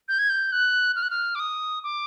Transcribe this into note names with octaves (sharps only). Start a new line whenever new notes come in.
G6
G#6
G6
F#6
F6
F#6
F6
D6
D#6
D6